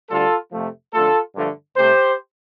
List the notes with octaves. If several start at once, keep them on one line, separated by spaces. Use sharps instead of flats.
D2 D3 G3 F4 A4
F2 C3 F3 A3
F2 D3 A3 F4 A4
G2 D3 F3 A3
C2 C3 A3 G4 C5